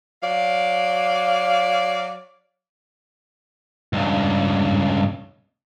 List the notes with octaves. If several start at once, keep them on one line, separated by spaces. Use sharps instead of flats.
F#3 D5 F5
C#2 G2